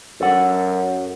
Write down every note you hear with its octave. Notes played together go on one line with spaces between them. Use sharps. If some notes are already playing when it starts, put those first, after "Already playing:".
F#2 A4 F#5